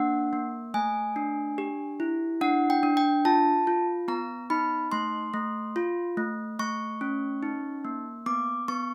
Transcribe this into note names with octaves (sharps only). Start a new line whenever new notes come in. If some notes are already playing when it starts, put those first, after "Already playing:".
Already playing: A#3 D4 F#5
A#3
A3 G#5
D4
G4
E4
D4 F#5
G5
D4
G5
F4 A5
F4
B3 A#5
D#4 B5
A3 C6
A3
F4
A3
A3 C#6
C#4
D#4
A#3
B3 D6
B3 C#6